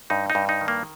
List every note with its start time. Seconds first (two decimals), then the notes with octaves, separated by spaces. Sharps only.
0.10 G2 D#4
0.30 D#4
0.35 G2
0.49 D#4
0.61 D#3
0.68 A#3